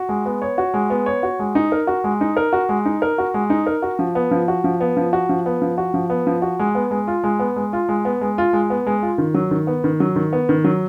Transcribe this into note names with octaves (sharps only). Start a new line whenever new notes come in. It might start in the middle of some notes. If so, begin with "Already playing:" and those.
Already playing: F#4
G#3
B3
C#5
F#4
G#3
B3
C#5
F#4
G#3
D#4
A#4
F#4
G#3
D#4
A#4
F#4
G#3
D#4
A#4
F#4
G#3
D#4
A#4
F#4
F3
B3
F3
F#4
F3
B3
F3
F#4
F3
B3
F3
F#4
F3
B3
F3
F#4
G#3
B3
G#3
F4
G#3
B3
G#3
F4
G#3
B3
G#3
F4
G#3
B3
G#3
F4
D#3
F#3
D#3
B3
D#3
F#3
D#3
B3
D#3
F#3